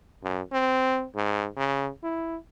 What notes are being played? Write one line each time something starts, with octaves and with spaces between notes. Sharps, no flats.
F#2
C4
G#2
C#3
E4